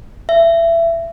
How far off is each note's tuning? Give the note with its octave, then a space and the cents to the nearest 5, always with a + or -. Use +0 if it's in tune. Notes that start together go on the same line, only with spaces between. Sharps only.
E5 +25